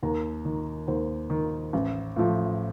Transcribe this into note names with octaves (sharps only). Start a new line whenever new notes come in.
D#2 A#5
D#3
D#2 C5
D#3
A1
A2 F3